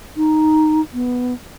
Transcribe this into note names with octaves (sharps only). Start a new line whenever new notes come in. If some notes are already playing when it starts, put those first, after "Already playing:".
D#4
B3